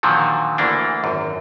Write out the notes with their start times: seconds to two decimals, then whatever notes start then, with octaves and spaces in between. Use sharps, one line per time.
0.03 A#2 D3 D#3 F3 F#3
0.58 D2 E3 A#3 D4
1.04 G#1 F#2